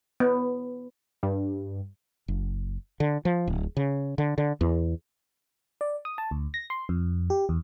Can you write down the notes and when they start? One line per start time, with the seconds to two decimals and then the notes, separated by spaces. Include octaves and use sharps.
0.20 B3
1.23 G2
2.28 F#1
3.00 D3
3.25 F3
3.47 D1
3.77 C#3
4.18 D3
4.38 D3
4.61 E2
5.81 D5
6.05 D#6
6.18 A5
6.31 D2
6.54 A#6
6.70 C6
6.89 F2
7.30 G4
7.49 E2